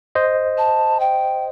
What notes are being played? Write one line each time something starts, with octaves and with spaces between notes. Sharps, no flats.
C5 D#5
A5
G5